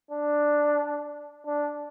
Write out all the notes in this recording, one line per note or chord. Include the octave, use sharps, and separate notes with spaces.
D4
D4